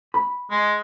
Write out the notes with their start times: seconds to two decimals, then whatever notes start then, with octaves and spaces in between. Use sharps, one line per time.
0.14 B5
0.51 G#3